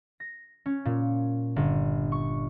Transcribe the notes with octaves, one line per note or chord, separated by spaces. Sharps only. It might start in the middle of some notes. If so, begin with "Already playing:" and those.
A#6
C#4
A#2
G1
C#6